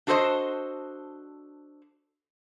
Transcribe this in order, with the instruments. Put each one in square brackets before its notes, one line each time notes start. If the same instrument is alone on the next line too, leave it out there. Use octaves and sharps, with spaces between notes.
[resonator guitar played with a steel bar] D4 F#4 A4 B4 C5 D#5